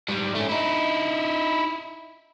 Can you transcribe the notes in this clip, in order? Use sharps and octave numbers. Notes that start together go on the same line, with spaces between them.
G#2 G3
A3 C#4
D#4 E4